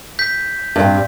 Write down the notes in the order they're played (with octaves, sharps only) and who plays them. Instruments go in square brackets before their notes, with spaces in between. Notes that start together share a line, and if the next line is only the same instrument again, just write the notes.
[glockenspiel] G6 B6
[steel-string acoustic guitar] G2 C4